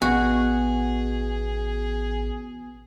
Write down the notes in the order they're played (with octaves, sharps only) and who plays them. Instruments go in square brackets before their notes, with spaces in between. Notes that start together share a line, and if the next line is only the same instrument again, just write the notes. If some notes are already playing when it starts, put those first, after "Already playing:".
[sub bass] A1 [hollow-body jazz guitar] B2 [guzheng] F#4 [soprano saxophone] G#4